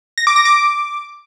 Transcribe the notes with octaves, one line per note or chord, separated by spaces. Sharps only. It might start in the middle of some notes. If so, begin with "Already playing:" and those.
A#6
D6
A#6
D6